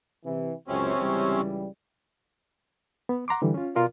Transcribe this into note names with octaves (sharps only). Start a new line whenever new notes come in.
C3 E3
C#2 F#2 C3 C4 C#4
C#2 E3 G3
B3
F#5 A#5 C6 D6
D3 E3 G3
C#4 F4
B2 F4 A#4 D5